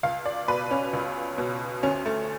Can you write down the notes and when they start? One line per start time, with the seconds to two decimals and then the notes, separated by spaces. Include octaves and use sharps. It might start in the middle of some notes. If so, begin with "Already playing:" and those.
0.03 C#2 F5
0.26 D5
0.48 B2 B4
0.71 C#4
0.93 C#2
1.38 B2
1.83 D2 C#4
2.06 A3